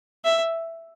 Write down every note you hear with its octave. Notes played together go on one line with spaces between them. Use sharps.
E5